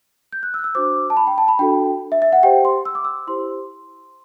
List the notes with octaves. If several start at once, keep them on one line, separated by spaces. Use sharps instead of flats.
G6
F#6
E6
F#6
E6
D4 F#4 C5 D6
A5
B5
G5
A5
B5
D4 F#4 A4 G5
E5
E5
F#5
G4 C5 G5
C6
E6
D6
E6
E4 G4 C5 C6